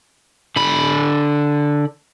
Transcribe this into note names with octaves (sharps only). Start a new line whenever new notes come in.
D3 B5